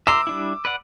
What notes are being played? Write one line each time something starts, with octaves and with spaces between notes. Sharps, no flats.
E5 A#5 C6 D6 E6
G3 D4 E4
B4 D5 F#5